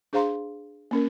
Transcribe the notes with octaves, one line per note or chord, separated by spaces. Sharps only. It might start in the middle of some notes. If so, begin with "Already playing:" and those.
D4 G#4 C5 F5 A#5 C6
A#3 C#4 A#4